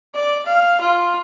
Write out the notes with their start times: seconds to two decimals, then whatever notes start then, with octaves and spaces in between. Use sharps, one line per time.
0.15 D5
0.45 F5
0.81 F4